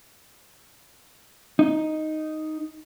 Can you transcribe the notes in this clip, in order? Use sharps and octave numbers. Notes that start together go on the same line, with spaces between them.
D#4